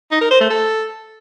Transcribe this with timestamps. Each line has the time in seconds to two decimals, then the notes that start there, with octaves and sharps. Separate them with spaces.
0.11 D#4
0.21 A#4
0.31 C5
0.41 A3
0.50 A4